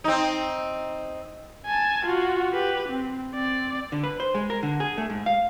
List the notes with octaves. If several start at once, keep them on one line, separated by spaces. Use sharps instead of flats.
C4 D#4
G#5 A5
F4 F#4
G4 B4
C4
C4 D5
D3
B4
C5
G#3
A#4
D3
G#4
A3
G#2
F5